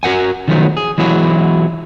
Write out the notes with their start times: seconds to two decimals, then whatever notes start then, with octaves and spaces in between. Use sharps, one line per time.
0.03 F#4 A#4 F#5 G#5
0.48 D#3 F3 F#3 A3 B3
0.77 G#4
0.98 E3 F#3 G#3 B3 E4 F#4